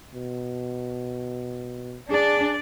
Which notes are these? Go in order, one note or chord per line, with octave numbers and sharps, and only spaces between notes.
B2
D4 G#4 D5